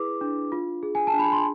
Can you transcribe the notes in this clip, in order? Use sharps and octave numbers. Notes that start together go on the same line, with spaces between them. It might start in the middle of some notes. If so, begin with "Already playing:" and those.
Already playing: E4 G#4 B4 D6
D4
F4
G#4
G#5
A5
D4
B5
C6